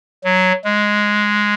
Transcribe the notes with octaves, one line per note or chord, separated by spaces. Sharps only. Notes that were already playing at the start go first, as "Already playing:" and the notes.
F#3
G#3